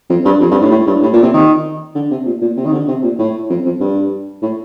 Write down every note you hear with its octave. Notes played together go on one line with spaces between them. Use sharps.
F2
G2
F2
G2
A2
A2
G2
A2
A#2
C3
D#3
D3
C3
A#2
A#2
C3
D#3
D3
C3
A#2
A2
F2
F2
G2
A2